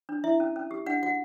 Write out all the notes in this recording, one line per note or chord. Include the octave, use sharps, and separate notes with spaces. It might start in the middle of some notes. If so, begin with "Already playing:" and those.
D4
E4 E5
C#4
C#4
G4
D4 F#5
F#4 F#5